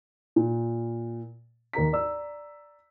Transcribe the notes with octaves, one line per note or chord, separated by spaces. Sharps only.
A#2
D#2 A#4 A#5 B6
D5 A#5 E6